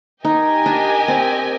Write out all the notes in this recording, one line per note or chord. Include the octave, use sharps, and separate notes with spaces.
D#4 G4 A#4 D#5 G#5
D4
C4